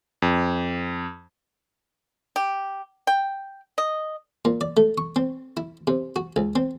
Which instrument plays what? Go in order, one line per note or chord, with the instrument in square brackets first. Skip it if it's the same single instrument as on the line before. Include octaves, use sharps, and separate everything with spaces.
[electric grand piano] F2
[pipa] G4
G5
D#5
[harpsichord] A#2
D5
A3
C#6
C4
E4
C3
F#4
C#2
C4